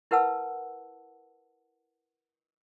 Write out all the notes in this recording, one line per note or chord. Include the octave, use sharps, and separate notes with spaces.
E4 A#4 B4 F#5 A5 E6